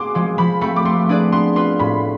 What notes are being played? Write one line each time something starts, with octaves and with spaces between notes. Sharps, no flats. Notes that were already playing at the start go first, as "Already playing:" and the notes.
Already playing: B3 G#4 G#5 C6 D6
F3 G#3 C6
F3 B5
A3 C4 B5
D6
A3 C6
D4 G#4 B4 D5
B3 C6
F4 B4 C6
A2 B5